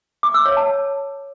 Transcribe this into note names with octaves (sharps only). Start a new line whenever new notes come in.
D6
E6
C#5
A5